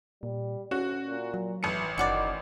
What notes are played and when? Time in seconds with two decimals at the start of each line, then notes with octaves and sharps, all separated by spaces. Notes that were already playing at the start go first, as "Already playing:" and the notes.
0.23 A#2 G3
0.71 D2 C#4 F#4
1.03 A#2
1.34 F#3
1.63 A1 E3 C#7
1.98 F#1 D#3 C#4 F#4 D5